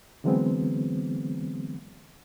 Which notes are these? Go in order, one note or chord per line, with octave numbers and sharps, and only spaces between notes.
D3 E3 F#3 G#3 B3 C4